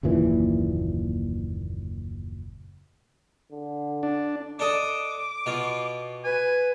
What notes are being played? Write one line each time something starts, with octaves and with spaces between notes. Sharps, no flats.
F#1 D#2 A#2 E3
D3
D4
D4 A4 D#5 D6
B2 F4
B4 G#5